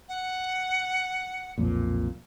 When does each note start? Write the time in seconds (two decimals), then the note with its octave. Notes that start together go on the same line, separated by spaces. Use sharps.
0.09 F#5
1.58 B1 F2 A#2